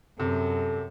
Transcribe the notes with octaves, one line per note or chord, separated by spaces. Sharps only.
F#2 C3 A4